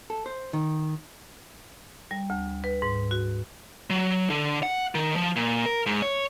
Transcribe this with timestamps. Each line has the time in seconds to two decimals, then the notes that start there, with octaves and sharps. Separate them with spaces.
0.10 A4
0.26 C5
0.53 D#3
2.11 G3
2.30 D2
2.64 B4
2.82 G#2
3.11 F#4
3.90 F#3
4.30 D3
4.63 F#5
4.95 D#3
5.16 F3
5.36 A#2
5.66 A#4
5.86 G#2
6.02 C#5